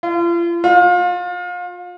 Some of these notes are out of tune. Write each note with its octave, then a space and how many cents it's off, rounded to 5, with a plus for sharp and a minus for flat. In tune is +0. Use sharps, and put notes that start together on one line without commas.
F4 -40
F4 +30